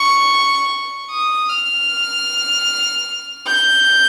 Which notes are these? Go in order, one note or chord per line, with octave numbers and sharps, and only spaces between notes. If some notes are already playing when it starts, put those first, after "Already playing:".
Already playing: C#6
D#6
F6
G6